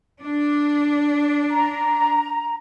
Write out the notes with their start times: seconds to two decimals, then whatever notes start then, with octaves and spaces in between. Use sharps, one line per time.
0.21 D4
1.51 A#5